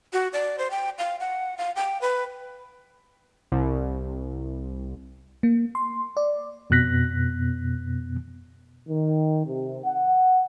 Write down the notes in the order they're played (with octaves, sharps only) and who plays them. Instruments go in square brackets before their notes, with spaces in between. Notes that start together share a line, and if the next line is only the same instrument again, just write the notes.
[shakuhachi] F#4
D5
C5
G5
F5
F#5
F5
G5
B4
[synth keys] C2
[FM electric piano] A#3
C6
D5
[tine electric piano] F2 B2 B3 F#6 A#6 B6
[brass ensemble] D#3
C3
F#5